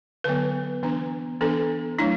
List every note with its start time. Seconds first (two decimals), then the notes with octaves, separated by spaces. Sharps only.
0.24 D3 F#3 B3 B4
0.83 E3 B3 D4
1.41 E3 B3 D4 A4
1.98 F#3 A3 D4 E4